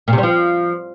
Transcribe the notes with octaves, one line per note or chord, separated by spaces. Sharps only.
A#2
C3
G3
F3